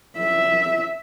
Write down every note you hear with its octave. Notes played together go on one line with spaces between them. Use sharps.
E5